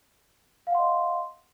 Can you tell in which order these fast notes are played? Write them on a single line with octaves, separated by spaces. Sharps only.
F5 F#5 C6 D#5